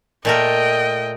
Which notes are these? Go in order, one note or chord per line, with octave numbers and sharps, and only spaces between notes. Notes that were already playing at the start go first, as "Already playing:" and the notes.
A#2 A3 A#4 D#5 G5